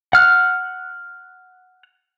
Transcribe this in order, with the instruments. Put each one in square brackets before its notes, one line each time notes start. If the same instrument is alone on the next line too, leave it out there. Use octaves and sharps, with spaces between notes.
[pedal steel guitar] F#5 F6 F#6